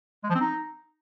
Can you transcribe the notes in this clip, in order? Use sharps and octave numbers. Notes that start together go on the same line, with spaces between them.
G#3
F3
C4
D#4